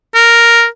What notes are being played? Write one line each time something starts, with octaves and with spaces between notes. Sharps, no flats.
A#4